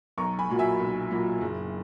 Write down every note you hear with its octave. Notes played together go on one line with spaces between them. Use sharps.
B1 A#5 C#6
G#5 B5
A#2 F#3 A#3
E5 G#5
B1
A#2 F#3 A#3
F#1